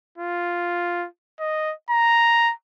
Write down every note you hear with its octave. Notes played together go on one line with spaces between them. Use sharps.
F4
D#5
A#5